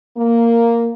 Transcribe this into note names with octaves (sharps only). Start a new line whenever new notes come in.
A#3